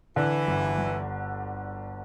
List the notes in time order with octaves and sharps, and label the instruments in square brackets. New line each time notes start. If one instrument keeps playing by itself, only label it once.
[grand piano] D3 [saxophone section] E3
[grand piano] G1
G1